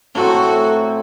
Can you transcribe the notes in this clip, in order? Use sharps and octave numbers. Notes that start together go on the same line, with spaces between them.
A2 F#3 C4 F#4 A4